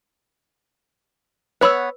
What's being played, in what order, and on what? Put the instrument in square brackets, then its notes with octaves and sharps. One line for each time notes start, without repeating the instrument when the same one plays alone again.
[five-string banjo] B3 C#5 F#5 [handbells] B4 B5 E6